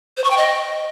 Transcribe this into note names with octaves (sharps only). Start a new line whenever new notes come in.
C5
C#6
G5
D#5